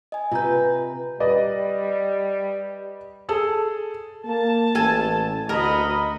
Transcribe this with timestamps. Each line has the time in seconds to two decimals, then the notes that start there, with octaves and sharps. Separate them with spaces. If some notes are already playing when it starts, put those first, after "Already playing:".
0.12 D#5 G#5
0.32 C3 F4 B4 A#5 G6
1.20 G3 B4 D5 D#5
3.29 G#4 A4
4.26 A#3 A5
4.75 A1 A4 G#5
5.49 D2 F#4 A#4 D#5 B5